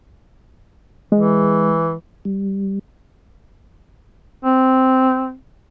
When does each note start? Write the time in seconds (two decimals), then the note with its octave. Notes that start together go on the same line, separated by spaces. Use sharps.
1.12 E3 G#3
2.25 G3
4.44 C4